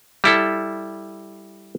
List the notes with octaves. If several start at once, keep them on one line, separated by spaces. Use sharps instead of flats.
G3 E4 A4